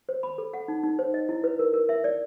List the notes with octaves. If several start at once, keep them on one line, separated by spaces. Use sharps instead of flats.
C5
B5
A4
F#5
D#4
D#4
C5
D#5
E4
B4
A#4
A#4
E5
D5